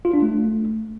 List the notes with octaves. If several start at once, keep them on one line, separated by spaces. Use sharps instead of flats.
F4
D4
A3